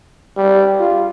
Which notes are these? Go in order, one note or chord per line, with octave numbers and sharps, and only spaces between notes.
G3
F4